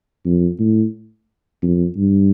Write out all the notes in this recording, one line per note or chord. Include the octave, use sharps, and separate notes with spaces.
F2
A2
F2
G2